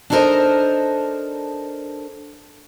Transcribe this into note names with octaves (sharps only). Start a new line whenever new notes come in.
D4 D#4 A4 A#4 C5 D#5